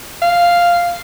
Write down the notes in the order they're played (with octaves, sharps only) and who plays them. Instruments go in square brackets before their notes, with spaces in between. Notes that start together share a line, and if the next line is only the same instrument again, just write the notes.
[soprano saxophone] F5